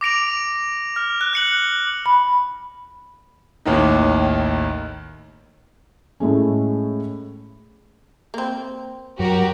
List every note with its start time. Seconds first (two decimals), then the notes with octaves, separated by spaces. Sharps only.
0.01 D6 A#6 D7 F7
0.96 F6
1.21 F#6
1.33 F#6 C#7 F#7
2.06 B5
3.65 A1 D#2 A2 D#3 D#4
6.20 A2 G#3 A3 C#4
8.34 A#3 C4
9.19 F#2 F#3 F#4 G4 A#4